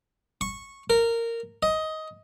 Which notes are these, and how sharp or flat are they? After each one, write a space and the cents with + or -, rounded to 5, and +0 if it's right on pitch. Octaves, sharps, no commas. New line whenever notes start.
C#6 -15
A#4 -15
D#5 +15